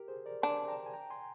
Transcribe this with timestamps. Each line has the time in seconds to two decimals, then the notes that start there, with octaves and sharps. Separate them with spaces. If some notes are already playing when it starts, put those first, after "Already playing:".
Already playing: G4 A#4
0.08 G#4 C5
0.26 A#4 D5
0.42 D4 G#5 C6
0.68 G5 A#5
0.86 G#5
0.93 G5 A#5
1.10 G#5 C6